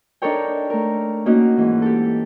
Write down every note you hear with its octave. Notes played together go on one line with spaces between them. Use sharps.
D4 D#4 A4 A#4 C#5 G5
A3 A#4
A#3 C#4 D#4 F#4
G#2 E3
G4 A4